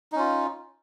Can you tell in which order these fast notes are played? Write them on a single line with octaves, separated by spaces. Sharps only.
D#4 C#4 F4